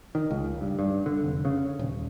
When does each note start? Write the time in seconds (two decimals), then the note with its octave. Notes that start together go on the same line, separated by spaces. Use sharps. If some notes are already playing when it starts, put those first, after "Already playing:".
0.15 D#3
0.31 C#2
0.61 G2
0.79 G2
1.06 D3
1.24 F1
1.45 C#3
1.79 D#1